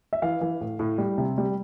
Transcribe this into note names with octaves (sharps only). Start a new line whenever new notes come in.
E5
E3 F5
E3
A2
A2
G3
C3
G3